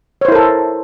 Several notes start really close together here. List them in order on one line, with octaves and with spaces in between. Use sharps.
C#5 C5 E4 A#4 A4